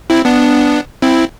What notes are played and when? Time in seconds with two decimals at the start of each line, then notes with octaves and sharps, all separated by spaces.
0.10 C4 E4
0.25 B3 D4
1.02 C4 E4